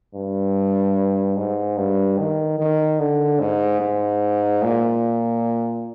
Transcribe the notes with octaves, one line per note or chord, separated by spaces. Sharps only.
G2
G#2
G2
D#3
D#3
D3
G#2
G#2
A#2